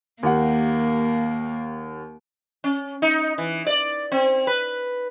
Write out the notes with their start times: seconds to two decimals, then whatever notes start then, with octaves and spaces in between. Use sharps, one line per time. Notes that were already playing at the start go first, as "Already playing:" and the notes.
0.23 D#2 A#3 G4 F#5
2.64 C#4
3.02 D#4
3.38 E3
3.67 D5
4.12 C4
4.47 B4